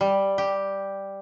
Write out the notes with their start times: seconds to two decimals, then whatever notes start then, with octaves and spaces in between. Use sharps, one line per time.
0.01 G3
0.38 G4